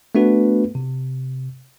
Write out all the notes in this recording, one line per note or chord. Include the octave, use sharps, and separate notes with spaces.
A3 B3 D4 F#4 B4
C3